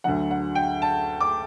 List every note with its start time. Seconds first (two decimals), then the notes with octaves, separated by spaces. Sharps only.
0.04 D2 D3 F#3 F#5
0.31 F#5
0.55 G5
0.82 A5
1.21 D6